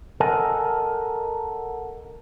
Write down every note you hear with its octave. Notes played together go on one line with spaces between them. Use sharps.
A4 A#4 D#5 F#5 G#5 A5